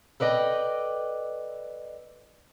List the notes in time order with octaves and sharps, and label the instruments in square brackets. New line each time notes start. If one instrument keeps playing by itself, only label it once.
[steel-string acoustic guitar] A4 B4 D5 D#5 G5